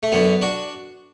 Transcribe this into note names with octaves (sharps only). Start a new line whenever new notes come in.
A3
F#2 D3 B3
D4 F#4